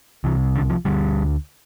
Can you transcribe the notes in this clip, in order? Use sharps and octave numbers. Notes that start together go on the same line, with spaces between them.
C2 C3 E3
D3
F3
D2 D3 G3